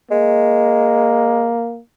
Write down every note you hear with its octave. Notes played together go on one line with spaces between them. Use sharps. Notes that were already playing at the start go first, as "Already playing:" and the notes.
G#3 A#3